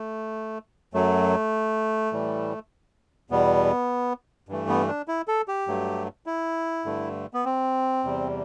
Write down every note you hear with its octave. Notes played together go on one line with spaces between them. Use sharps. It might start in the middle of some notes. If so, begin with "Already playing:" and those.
Already playing: A3
F#2 F#3 A3
A2 E3 G3
E2 B2 G3 B3
G2 E3 A3
B3
D4
E4
A4
G4
G2 F#3 A3
E4
G2 D3 A3
B3
C4
E2 C3 G3